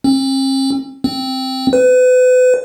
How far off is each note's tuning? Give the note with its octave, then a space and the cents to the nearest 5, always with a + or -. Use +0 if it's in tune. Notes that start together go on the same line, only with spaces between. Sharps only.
C4 +45
C4 +0
B4 +35